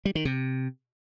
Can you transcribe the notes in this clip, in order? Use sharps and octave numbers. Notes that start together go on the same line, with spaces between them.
G3
D#3
C3